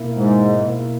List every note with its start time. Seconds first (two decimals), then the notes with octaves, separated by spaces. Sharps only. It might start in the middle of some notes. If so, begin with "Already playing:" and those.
Already playing: B2 A#3 E4
0.15 G#2
0.61 B2 A#3 E4